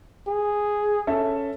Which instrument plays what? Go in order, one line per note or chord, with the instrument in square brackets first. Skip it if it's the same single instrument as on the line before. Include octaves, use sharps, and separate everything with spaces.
[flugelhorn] G#4
[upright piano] C#4 A4 E5